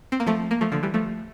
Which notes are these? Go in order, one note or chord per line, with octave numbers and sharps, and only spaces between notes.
C4
A#3
F3 A3
A#3
F3 A3
D3 F3
E3 G3
F3 A3